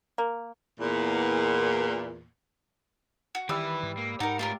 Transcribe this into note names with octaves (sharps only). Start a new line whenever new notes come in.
A#3
E2 A#2
F#4
D#3 E3 G3 E4 B4 E6
G#2
A#3
G#2 D#4 A#4 F#5
A3 F4 G4 A4 A#4